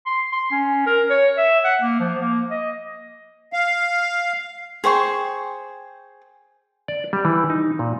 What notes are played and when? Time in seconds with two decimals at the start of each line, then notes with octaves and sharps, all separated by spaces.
0.06 C6
0.32 C6
0.51 C#4
0.86 A#4
1.10 C#5
1.38 E5
1.64 F#5
1.82 A#3
2.00 F3
2.21 A#3
2.51 D#5
3.53 F5
4.84 G#4 C5 G5 C#6
6.88 D5
7.13 G3
7.25 E3
7.50 D#4
7.79 A#2